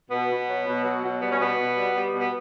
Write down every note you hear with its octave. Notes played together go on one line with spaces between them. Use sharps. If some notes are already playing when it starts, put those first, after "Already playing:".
B2 B3
B2
F#3
B2
F#3
B2
G3 B3
C#4
B2 B3
B2
G3
G3
B2
B3